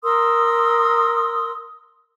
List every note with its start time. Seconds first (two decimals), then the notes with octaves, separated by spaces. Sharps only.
0.03 A#4 C6 D#6 E6